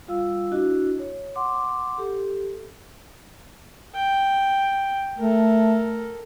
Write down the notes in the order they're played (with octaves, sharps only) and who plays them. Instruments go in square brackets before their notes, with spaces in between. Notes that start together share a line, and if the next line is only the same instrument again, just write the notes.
[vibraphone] G3 F4 F5 E6
D4 E4 F#4 D#5
C#5
F#5 C6 D6
G4 A4
[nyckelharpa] G5
[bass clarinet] A3 [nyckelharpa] A4 A#4